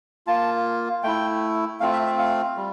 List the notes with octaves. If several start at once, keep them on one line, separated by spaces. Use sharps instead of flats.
A#3 F4 A5
A3 E4 G5
A3 C4 F4 F5
E5
E5
F5
G3